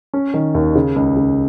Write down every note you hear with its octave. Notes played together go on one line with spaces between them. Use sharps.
C#4
D#3
D#2
C#3
C#2
C#3